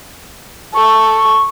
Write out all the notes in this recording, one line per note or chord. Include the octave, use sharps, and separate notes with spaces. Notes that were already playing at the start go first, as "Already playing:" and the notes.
A4 C#6